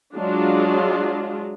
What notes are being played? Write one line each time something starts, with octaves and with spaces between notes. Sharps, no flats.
F#3 G#3 D4 F4